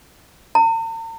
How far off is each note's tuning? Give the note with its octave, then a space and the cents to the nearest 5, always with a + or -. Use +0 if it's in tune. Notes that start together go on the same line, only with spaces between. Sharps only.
A#5 -45